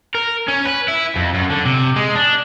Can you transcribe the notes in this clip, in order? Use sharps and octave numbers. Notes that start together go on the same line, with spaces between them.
A#4
C#4
B4
E4
F2
F#2
D3
C3
G#3
D4